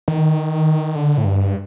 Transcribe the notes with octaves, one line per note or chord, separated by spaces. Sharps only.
D#3
D3
A2
G2